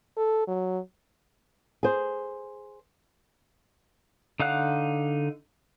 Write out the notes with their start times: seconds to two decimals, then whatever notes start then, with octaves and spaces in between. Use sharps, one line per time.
0.17 A4
0.47 F#3
1.83 G#4 C5
4.40 D3 D#4 F5 F#5 F#6